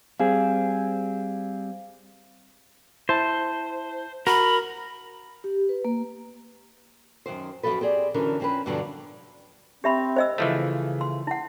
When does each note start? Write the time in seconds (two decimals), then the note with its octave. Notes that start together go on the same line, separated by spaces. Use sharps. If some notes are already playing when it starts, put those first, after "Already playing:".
0.20 G3 C4 G#4 F5
3.09 E4 C5 A5
4.27 F#4 A#4 B5
5.44 G4
5.69 B4
5.85 A#3
7.26 F#2 C3 D#3 C5
7.63 F#2 A#2 F3 A4 B4
7.81 C4 G4 G#4 D5
8.14 F#2 D3 E3 F3 C#4 A#4
8.40 F3 C4 C#4 G#4 B4
8.66 G2 B2 D3 F3 F#3
9.84 C4 G4 E5 B5
10.16 C5 D#5 E6
10.38 C#3 E3 F3 A3
11.01 C6
11.27 E4 F#5